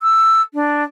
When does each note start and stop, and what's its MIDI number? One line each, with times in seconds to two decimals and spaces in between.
0.01 0.42 88
0.54 0.83 62